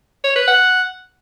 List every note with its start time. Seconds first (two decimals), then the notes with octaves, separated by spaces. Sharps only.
0.24 C#5
0.36 B4
0.47 F#5